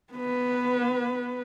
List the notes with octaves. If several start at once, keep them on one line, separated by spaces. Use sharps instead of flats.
B3 B4